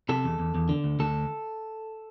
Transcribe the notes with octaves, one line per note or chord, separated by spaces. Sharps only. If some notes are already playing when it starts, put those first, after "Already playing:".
C3 A4
E2
E2
E2
D3
D2
D2 A4